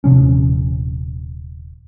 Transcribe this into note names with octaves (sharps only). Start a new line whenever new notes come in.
D#1 C3 F3 C#4